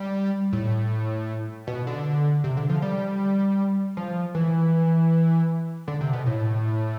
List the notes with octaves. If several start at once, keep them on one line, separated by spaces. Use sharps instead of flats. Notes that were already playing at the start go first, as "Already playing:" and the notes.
Already playing: G3
A2
B2
D3
C3
D3
F3
G3
F3
E3
D3
C3
B2
A2